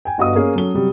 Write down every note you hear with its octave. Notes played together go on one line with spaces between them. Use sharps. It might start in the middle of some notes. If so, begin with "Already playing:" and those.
G5 G#5
G1 G2 F#4 D#5 F5 D#6
A#3 C#4 G#4
F#3 C#4 A4 G7
C3 F#3 G3